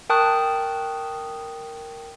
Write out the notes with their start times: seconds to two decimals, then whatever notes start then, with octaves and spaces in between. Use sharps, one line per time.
0.10 A#4 G5 A5 C#6 D#6 F#6